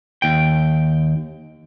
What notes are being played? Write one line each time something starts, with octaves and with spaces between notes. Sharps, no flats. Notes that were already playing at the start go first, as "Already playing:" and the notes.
D#2 G5